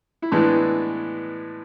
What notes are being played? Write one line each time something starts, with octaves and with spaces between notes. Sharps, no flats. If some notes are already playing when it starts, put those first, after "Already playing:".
E4
A2 E3 G#3 B3 D4